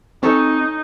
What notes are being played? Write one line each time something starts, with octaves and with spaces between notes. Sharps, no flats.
C4 C#4 D#4 A4 C#5